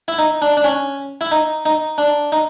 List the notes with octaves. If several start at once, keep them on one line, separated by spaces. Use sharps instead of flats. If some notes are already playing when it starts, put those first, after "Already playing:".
E4
D#4
D4
D4
C#4
E4
D#4
D#4
D4
D#4